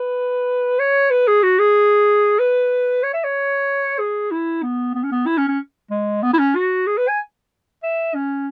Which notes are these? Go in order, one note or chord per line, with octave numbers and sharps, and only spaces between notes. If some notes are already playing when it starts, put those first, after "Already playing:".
Already playing: B4
C#5
B4
G#4
F#4
G#4
B4
C#5
E5
C#5
G#4
E4
B3
B3
C#4
B3
E4
C#4
C#4
G#3
B3
E4
C#4
F#4
G#4
B4
G#5
E5
C#4